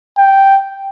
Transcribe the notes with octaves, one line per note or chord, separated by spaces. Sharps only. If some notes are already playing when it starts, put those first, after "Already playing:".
G5